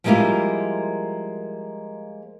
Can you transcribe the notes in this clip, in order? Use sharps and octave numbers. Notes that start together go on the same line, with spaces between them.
F3 G3 G#3 A#3 E4 F4